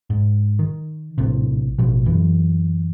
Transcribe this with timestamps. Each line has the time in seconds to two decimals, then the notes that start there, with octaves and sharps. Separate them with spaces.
0.10 G#2
0.59 D#3
1.18 A#1 A2 C3
1.78 A1 B2 F3
2.06 F#2 E3